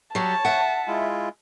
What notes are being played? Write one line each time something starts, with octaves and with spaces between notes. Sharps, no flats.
F#3 G3 C#5 A5
E5 F#5
G#3 E4 F4